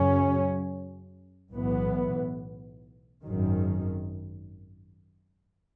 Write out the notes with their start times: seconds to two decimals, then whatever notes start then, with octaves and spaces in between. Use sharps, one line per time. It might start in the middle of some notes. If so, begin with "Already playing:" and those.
Already playing: F#2 C#3 F#3 C#4
1.52 B1 A2 E3 B3
3.24 G#1 F#2 D#3